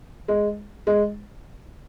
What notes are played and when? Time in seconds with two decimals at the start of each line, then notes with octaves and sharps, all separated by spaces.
0.28 G#3
0.87 G#3